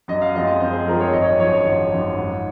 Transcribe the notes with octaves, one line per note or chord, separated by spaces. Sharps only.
F#2 D#5
F5
F3 G#3 C4 F4 D#5
D#5
F#2 C5
G#4
F3 G#3 C4 F4 A#4
C#5
G#1 D#5
C#5
D#5
F#2 F3 C#5
C#5
G#1
F#2 F3
G#2